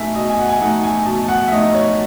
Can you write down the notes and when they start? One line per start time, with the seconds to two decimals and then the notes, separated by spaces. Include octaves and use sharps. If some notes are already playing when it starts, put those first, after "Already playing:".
Already playing: B2 A3 D#4 E5 G#5
0.15 B2 D#5
0.30 G#5
0.39 F#5
0.49 G#5
0.61 A3 D#4 F#5
0.83 G#5
1.06 B2 A5
1.29 F#5
1.48 E5
1.52 A3 D#4 D#5
1.74 C#5